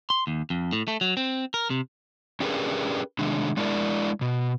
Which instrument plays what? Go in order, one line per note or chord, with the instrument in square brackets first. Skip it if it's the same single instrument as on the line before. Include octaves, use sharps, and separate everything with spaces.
[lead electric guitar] C6
D#2
F2
A2
A3
F#3
C4
A#4
C3
[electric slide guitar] C#4 D4 G4 G#4 A#4 B4
C3 D#3 G#3 D4
G#3 D4 E4 A#4 D5
B2